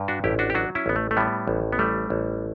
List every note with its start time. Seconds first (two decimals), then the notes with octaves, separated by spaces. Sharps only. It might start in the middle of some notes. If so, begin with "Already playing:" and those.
Already playing: G2
0.08 D4 F#4
0.24 A1 E4 G4
0.39 D4 F#4
0.50 G4
0.55 F#3 D4 F#4
0.75 C#4 E4
0.86 A1 B3
0.96 A3
1.11 A3
1.17 A2 G3 B3
1.48 A1
1.73 B3
1.79 G3 A3
2.10 A1